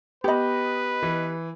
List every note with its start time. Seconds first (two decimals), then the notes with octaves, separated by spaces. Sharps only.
0.24 B3 G4 B4 D#5 B5
1.03 E3